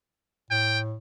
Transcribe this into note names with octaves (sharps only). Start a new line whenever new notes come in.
A2 G5